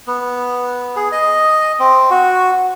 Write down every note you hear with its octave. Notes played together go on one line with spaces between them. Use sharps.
B3
G#4
D#5
C4
F#4